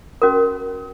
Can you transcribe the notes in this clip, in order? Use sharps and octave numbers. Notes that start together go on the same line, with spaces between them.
C#4 F#4 A#4